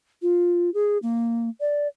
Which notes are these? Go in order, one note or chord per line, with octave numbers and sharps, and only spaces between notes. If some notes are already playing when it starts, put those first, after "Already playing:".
F4
G#4
A#3
D5